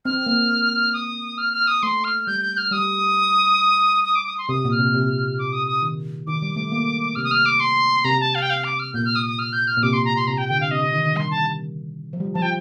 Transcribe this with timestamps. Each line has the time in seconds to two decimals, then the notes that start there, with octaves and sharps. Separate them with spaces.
0.05 C4 F6
0.26 A#3
0.93 D#6
1.38 F6
1.53 F6
1.67 D#6
1.83 A3 C6
2.04 F6
2.27 G3 G6
2.42 G6
2.57 F6
2.71 G3 D#6
4.04 D#6
4.15 D6
4.27 D#6
4.38 C6
4.49 C3 D#6
4.65 A#2
4.71 F6
4.79 C3
4.94 C3
5.38 D6
5.52 D#6
5.67 D#6
5.82 D#3
6.27 D#3 D6
6.42 G3
6.56 A3
6.72 A#3
7.15 C3 F6
7.24 D#6
7.31 F6
7.45 D6
7.60 C6
8.04 C3 A#5
8.20 A5
8.35 F5
8.42 G5
8.50 F5
8.64 D6
8.79 F6
8.94 A#2 G6
9.05 F6
9.16 D#6
9.27 D#6
9.39 F6
9.53 G6
9.67 F6
9.77 A#2
9.83 C3 D6
9.93 C6
10.05 A#5
10.16 C6
10.27 C3 A#5
10.38 G5
10.49 D3 G5
10.61 F5
10.71 C3 D#5
10.83 D3
10.93 D#3
11.05 D#3
11.16 G3 C6
11.31 A5
12.13 F3
12.20 G3
12.34 F3 A5
12.42 G5